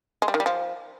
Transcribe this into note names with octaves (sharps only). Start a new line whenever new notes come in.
G#3
G3
D#3
G3
F3